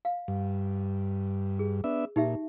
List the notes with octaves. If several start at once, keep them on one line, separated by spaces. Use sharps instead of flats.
F5
G2
G#4
B3 D4 E5
A#2 D#4 G4 E5